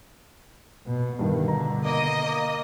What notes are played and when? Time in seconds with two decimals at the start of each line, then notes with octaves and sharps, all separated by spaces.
0.87 B2
1.19 G2 B2 D3 D#3
1.48 A#5
1.84 A#3 D#5
2.24 A#3